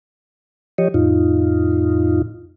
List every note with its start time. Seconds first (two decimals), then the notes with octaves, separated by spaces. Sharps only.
0.78 F3 G4 C#5 D#5
0.94 F2 A2 D#4 F4